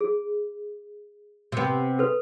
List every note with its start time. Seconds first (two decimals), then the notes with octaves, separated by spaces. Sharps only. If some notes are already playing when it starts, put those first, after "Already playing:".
0.01 G#4
1.52 C3 B3
1.99 A4 B4